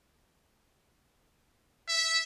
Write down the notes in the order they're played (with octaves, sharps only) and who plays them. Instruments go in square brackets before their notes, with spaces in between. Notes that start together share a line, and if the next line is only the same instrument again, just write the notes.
[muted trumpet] E5